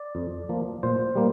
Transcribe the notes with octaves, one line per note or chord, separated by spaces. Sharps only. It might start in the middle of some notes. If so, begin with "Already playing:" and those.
Already playing: D5
F2
F3 A#3
A#2 C5
G3 A#3